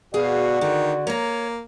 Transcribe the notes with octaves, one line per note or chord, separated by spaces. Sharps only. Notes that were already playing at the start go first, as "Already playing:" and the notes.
B2 F#4 G#4 D5 F5
D3 D#3
A#3 C#5 A#5